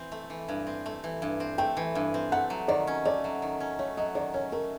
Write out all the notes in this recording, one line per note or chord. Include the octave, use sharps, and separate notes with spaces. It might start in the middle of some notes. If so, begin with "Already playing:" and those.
Already playing: E3 C4
A3
E3
G2
C4
A3
E3
G2
C4
A3 G5
E3
G2
C4
A3 F#5
F#3
D#3 D5
C#4
A3 D5
F#3
D#3
C#4
A3 C#5
F#3 D#5
D#3 D5
C#4 C#5
A3 A#4